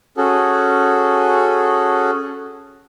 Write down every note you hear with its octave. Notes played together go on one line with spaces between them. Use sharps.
C#4 F#4 G#4 A4